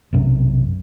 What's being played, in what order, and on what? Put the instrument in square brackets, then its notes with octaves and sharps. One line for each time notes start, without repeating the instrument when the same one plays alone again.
[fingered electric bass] B1 F#2 C3